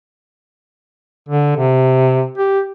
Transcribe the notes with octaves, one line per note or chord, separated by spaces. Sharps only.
D3
C3
G4